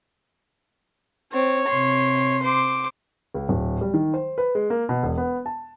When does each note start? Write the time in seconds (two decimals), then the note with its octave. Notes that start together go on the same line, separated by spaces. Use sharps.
1.33 C4 C#5
1.68 C3 C6
2.43 C5 D6
3.34 C#2
3.49 D1
3.81 G3
3.94 D#3
4.14 C5
4.38 B4
4.55 G#3
4.70 A#3
4.89 B2
5.03 E1
5.18 B3
5.46 A5